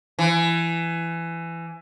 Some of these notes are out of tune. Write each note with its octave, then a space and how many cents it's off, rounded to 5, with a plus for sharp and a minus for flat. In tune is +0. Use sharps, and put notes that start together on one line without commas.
E3 +20